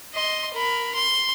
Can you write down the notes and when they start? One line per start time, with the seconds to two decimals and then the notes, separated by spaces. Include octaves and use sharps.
0.14 D#5 C6
0.54 A#4 B5
0.95 C6